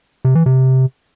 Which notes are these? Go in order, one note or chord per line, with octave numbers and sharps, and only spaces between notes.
C3
E3
C3